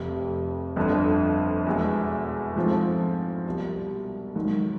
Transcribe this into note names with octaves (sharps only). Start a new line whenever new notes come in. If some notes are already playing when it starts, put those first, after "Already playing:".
Already playing: F1 F2 C3
G1 F2 D3 F3
E2 B2 G#3
G#2 F3 A3 C4 F4
C2 B2 G3
G#2 D#3 F#3